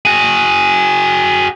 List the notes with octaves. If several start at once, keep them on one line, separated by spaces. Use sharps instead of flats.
F#4 G#4